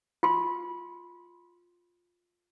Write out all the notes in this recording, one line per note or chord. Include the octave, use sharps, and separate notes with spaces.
F4 C6